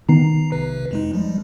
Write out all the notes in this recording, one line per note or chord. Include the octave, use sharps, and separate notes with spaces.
D#3 B3 A#5 C7
B1 C3 B4
F2 G#3 D#4
F3 G3 G#3